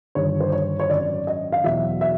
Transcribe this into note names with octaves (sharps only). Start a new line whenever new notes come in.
G1 G2 D#3 G3 C#5
C5
C#5
C#5
G#1 F#2 D#3 D5
D#5
F5
E2 B2 F#3 E5
E5